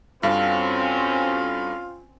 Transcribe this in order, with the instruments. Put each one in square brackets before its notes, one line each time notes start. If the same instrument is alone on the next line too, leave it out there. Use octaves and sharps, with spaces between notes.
[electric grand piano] G2 [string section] C4 C#4 [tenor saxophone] F4 [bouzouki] F#4 A4 F5